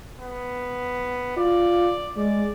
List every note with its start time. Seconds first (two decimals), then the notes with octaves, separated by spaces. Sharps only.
0.20 B3
1.37 F4 D5
2.17 G#3 D5